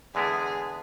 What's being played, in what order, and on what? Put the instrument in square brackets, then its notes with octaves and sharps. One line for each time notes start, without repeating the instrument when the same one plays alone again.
[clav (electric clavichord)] E2 D3 G#3 B3 E4 [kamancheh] G#4